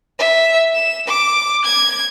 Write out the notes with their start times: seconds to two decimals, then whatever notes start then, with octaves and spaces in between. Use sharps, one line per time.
0.19 E5
0.74 E7
1.08 D6
1.65 G#6